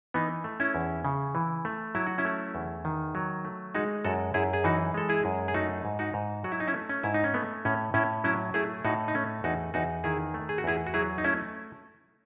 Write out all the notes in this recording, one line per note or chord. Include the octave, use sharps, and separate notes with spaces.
E3 B3 D#4
A3
C#4 E4
E2
C#3
E3
A3
F#3 E4
F#4
C#4 E4
A3
E2
D#3
F#3
A3
G#3 D#4 F#4
F#2 F#4 A4
F#2 E4 G#4
G#4
E3 D#4 F#4
G#3 A4
E4 G#4
F#2
G#4
A3 D#4 F#4
G#2
D#4 F#4
G#2
F#3 F#4
E4
D#4
C#4 E4
A3
C#4
G#2 E4
D#4
C#4
A3 B3
A2 C#4
A2 C#4 E4
F#3 C#4 E4
A3 E4 G#4
A2 D#4 F#4
D#4
A3 C#4
E2 D#4 F#4
E2 D#4 F#4
D#3 E4 G#4
A3
G#4
F#4
E2 E4 G#4
F#4
F#3 E4 G#4
D#4
A3 C#4 E4